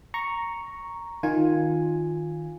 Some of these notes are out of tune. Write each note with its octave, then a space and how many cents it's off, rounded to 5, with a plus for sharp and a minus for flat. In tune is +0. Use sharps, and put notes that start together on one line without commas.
A#5 +0 C#6 +0
D#3 +0 F4 +10 G#5 +0